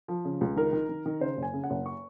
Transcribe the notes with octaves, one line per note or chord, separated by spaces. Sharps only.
F3
C#3
C#2
D#3 A#4
D#3
D#3
D#3
C#3 C5
F#1
G#5
C#3
F#5
F#1
C#6